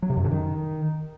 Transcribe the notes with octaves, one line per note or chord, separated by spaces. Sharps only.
F#3
C3
F#2
D3
D#3